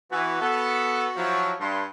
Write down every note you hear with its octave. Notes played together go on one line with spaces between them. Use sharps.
E3 B3 F#4
B3 A4
F3 F#3 E4
G2 C6